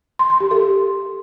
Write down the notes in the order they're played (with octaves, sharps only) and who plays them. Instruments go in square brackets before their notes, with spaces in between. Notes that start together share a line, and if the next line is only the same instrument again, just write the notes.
[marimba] C6
C6
G4
A4